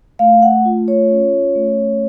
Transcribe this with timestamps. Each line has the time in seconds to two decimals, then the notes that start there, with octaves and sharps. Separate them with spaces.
0.19 A3 F5
0.42 F#5
0.65 F4
0.88 C#5
1.10 C#4
1.55 A3